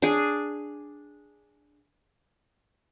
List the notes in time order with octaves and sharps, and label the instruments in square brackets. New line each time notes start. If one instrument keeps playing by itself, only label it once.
[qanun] D4 G#4